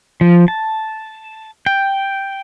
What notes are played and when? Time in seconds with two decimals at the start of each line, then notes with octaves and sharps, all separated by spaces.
0.21 F3
0.48 A5
1.66 G5